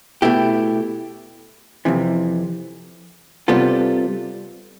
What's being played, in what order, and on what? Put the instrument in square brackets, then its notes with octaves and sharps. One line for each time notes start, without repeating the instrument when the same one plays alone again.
[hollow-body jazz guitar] B2 A3 E4 G4
F2 C3 E3
C3 G3 B3 F4 A4